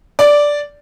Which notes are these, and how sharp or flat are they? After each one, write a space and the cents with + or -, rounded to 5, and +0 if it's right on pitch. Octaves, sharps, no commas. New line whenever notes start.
D5 -5